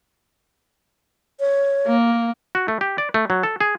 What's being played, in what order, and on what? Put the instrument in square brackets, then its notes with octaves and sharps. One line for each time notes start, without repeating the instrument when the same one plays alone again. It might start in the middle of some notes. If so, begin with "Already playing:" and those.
[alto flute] C#5
[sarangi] A#3
[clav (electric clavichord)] F#4
A3
G4
D5
A3
F#3
A4
G#4